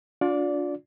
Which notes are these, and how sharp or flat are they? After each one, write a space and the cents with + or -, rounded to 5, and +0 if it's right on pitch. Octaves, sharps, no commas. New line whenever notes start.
D4 -20 F4 +35 D5 -15